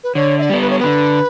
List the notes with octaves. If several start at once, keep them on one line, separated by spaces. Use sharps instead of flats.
B4
D3 C#5
E5
D5
G3 B3
B4
C#5
D3 B4